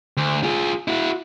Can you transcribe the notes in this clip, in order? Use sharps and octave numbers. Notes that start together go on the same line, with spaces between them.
D2
F4 G#4
E4 F#4